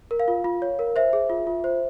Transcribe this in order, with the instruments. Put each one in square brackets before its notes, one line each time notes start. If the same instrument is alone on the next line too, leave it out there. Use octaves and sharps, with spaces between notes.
[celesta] A#4
F5
F4
F4
C#5
A#4
C5 E5
G#4
F4
F4
C5